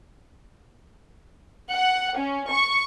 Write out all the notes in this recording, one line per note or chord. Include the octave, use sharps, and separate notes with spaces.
F#5
C#4
C#6